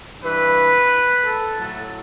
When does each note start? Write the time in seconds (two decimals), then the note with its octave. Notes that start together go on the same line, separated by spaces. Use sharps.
0.22 G2 E3 B4
1.25 A4
1.59 A2 F#3 A4